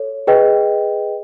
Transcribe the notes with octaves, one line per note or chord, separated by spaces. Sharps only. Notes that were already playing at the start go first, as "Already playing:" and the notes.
Already playing: A4 C#5
G#4 B4 D#5 G5